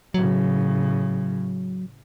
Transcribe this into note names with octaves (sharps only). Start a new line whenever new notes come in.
A2 C#3 F#3